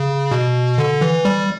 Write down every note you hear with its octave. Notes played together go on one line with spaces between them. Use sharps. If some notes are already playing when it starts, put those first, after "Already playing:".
Already playing: C#3
B2
D3
E3
G3